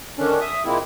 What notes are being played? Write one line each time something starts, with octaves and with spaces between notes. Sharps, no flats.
D3 D#3 C#4 D4
E5 D#6
A#2 G#3 A#3 C4 E4